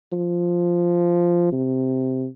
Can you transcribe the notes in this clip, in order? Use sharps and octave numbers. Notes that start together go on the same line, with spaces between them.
F3
C3